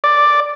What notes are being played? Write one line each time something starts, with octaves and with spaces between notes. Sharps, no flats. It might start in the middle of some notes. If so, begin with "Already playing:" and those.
D5